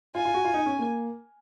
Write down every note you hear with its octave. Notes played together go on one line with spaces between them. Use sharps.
F4 G#5
F4
F#4
F4
D#4
C#4
A#3